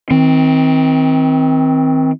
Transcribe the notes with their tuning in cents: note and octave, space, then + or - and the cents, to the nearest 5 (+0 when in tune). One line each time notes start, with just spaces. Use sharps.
D#3 +40 C4 +0